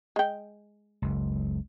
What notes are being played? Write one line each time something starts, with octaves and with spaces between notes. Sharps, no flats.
G#3 G5
F#1 C#2